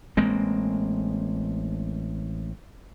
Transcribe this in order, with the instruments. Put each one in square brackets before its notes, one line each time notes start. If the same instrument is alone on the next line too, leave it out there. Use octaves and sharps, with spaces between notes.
[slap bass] A1 G#3 A#3 C4